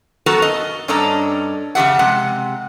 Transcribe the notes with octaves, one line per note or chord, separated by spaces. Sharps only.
F#2 B3 F#4 A4 A#4 A#5
D#5
G2 C#4 D4 A4 D#5 A#5
F2 C#3 A3 G4 E5 F#5
C3 G#3 F#5